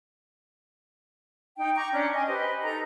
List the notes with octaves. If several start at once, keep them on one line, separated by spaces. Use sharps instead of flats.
D#4 G5
A#5 C#6 D6 G6
C#4 D4
D#5 G#5
G4 B4 C5 D#5
D#4 A4 A#5